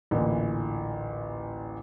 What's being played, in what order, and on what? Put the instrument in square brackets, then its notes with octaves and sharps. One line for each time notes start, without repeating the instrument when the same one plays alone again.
[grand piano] A1 D2 A#2 E3